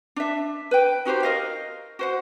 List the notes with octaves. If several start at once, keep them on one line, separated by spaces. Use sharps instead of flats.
D4 E5
B4 G5
D#4 F#4 G4 C5
A#4 D#5 F5
F#4 C5 F#5